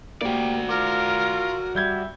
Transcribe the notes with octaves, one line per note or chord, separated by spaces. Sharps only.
A#3 F#4 G4 D5
F4 A#4 D6
G3 E5 G6 G#6